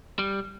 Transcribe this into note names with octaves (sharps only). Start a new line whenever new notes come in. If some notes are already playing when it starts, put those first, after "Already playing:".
G3